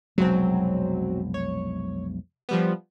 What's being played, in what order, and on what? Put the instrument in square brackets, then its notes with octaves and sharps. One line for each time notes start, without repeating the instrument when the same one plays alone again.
[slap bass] F1 B1 G#3 [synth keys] F#3 C4
[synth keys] C#5
F3 G3 B3